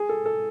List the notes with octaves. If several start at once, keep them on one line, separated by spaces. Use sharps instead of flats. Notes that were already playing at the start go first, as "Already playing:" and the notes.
Already playing: G#4
A4
A4